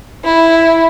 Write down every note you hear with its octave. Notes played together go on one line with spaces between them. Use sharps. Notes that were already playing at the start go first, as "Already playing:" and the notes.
E4